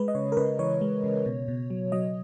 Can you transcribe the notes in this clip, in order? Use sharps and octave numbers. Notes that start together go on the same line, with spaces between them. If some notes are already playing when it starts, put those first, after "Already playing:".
Already playing: G#3 B4
D#5
C#3 C#5
A#4
C#3 B4
E3 C#5
G#3
C#3
B2
B2
F#3
F#3 D#5